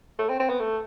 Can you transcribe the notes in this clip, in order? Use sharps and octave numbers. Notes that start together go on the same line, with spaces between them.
A3
C4
C4
B3
A3